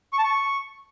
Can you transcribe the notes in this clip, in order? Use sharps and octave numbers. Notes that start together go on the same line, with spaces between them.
C#6
A5
C#6